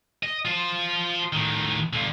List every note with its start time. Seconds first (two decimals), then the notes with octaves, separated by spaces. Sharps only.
0.23 D#5
0.45 F4 C5
1.33 A2 D#3
1.93 G2 D3